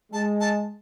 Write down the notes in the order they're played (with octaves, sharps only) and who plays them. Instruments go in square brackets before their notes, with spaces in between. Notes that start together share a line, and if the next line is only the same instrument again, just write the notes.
[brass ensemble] G#3 [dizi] A5
[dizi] A5